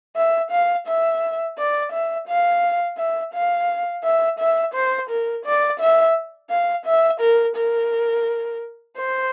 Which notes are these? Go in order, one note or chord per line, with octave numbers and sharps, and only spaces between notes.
E5
F5
E5
D5
E5
F5
E5
F5
E5
E5
C5
A#4
D5
E5
F5
E5
A#4
A#4
C5